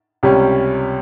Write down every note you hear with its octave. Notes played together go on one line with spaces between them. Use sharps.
C#2 C3 G3 C#4